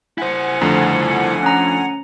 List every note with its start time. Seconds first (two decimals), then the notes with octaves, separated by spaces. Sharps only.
0.18 E4 C5 F#5 G#5
0.61 F2 D3 A3 A#5
1.43 C#4 A#5